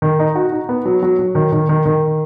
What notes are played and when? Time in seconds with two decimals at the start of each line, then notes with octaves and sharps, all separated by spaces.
0.02 D#3
0.19 D#4
0.35 F#4
0.52 D#4
0.69 B3
0.85 F#3
1.03 F#3
1.19 F#3
1.35 D#3
1.52 D#3
1.69 D#3
1.86 D#3